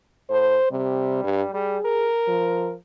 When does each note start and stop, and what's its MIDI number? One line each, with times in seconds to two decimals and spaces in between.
0.30 0.58 45
0.30 0.67 72
0.71 1.24 48
0.71 1.49 55
1.24 1.42 43
1.54 1.78 55
1.54 2.10 68
1.85 2.73 70
2.28 2.76 53